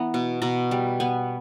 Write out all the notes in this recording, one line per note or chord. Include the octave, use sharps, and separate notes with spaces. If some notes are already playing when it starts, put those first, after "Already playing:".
Already playing: E3 B3 A#5
B2
B2 A#5
G3
B3 G#5